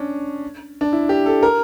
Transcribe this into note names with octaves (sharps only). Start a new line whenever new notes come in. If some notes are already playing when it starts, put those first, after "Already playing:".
Already playing: C#4 D4
D4
E4
G4
A4
A#4